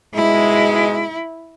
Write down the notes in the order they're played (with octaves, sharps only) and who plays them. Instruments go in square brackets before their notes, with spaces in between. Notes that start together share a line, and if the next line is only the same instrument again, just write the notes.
[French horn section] G#2 B2 G#3 [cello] E4